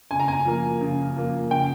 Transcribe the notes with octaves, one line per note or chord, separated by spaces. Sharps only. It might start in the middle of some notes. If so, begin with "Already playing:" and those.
C#3 G#5
A#5
G#5
F3 A#3
C#3
F3 A#3
C#3 G5